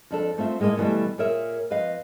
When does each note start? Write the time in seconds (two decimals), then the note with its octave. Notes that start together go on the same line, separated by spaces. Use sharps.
0.11 F2 D4 A4
0.38 A3 C4 F4 E5
0.60 A2 G#3 A#3 G4 D#5
0.77 B2 E3 F#3 G3 A3
1.18 A#2 G#4 A#4 C#5 E5
1.70 F2 B4 D#5 F5